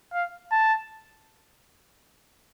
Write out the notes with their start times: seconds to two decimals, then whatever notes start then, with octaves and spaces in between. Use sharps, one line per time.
0.13 F5
0.51 A5